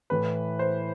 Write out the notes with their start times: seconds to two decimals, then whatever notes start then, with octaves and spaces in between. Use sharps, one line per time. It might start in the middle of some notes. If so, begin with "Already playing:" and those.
0.10 A2 E3 A3 B4
0.59 C5